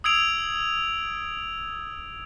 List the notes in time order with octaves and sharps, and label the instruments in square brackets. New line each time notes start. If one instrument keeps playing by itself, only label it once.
[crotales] D#6 E6 G#6 D7 F7